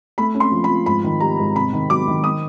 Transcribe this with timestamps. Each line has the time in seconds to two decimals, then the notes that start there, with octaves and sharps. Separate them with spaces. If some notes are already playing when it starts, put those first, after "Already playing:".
0.18 A3 B5
0.35 C#4
0.40 C6
0.52 F3
0.64 B5
0.69 F3
0.86 G#2 B5
1.04 D#3
1.20 G3 A#5
1.38 G#2
1.56 C3 B5
1.73 D#3
1.90 F#3 D6
2.08 D#3
2.24 D#6